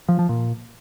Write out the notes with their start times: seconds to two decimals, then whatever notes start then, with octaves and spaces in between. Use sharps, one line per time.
0.09 F3
0.19 F3
0.29 A#2